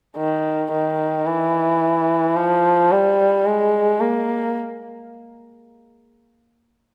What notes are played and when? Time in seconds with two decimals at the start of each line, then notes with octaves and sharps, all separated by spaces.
0.17 D#3
0.71 D#3
1.27 E3
2.36 F3
2.91 G3
3.46 G#3
4.00 A#3